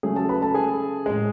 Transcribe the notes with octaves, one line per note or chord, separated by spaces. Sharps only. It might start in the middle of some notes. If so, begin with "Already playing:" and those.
C#3 F#3 A3 G#4 G#5
A4 A5
B4 B5
A4 A5
G#4 G#5
A2 G#3